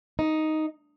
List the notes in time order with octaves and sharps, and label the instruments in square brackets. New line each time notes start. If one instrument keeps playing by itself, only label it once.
[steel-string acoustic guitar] D#4